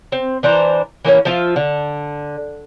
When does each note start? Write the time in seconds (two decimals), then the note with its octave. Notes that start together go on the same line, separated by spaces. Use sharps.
0.12 C4
0.43 E3 D4 C5 A#5
1.05 E3 A#3 C4 C#4
1.25 F3 F4 E5
1.56 D3